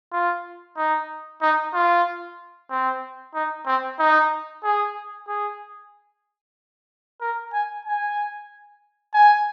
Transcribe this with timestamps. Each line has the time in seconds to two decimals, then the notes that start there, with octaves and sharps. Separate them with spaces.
0.12 F4
0.77 D#4
1.42 D#4
1.74 F4
2.71 C4
3.34 D#4
3.67 C4
3.99 D#4
4.64 G#4
5.28 G#4
7.21 A#4
7.53 G#5
7.86 G#5
9.14 G#5